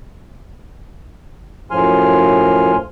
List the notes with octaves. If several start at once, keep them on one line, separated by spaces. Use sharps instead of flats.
F#2 A2 F3 G#5 C6 F6